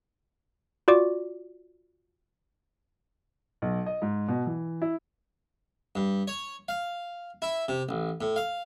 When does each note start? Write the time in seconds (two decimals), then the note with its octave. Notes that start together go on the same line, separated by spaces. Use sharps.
0.88 F4 F#4 D5 D6
3.62 B1
3.86 D#5
4.02 G#2
4.28 B2
4.46 E3
4.82 E4
5.95 G2
6.28 C#5
6.68 F5
7.42 E4
7.68 C3
7.89 A1
8.21 A2
8.36 F5